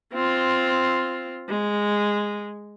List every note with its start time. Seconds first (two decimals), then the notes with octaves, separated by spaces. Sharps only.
0.14 C4 F4
1.49 G#3